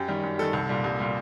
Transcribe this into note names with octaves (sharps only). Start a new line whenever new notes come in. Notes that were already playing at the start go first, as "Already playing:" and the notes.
Already playing: F#2 G4
D#3 G3
F#2
D#3 G3 A4
C2
A#2 G3
C2
A#2 G3